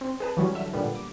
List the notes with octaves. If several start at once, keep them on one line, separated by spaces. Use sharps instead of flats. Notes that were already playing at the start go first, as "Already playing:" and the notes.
C4
G#4 B4 A5
E3 F#3 G3 C#4
D3 E5
A#2 D3 G3 B3
D6